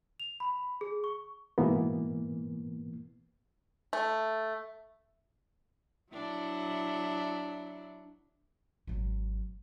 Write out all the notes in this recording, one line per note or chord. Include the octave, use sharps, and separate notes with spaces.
F7
B5
G#4
C#6
G#2 B2 E3 A#3 B3
A3
F#3 D4 E4
G#1 F#3